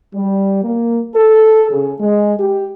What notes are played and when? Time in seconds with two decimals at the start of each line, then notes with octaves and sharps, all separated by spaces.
0.14 G3
0.63 A#3
1.16 A4
1.70 C#3
1.99 G#3
2.39 G4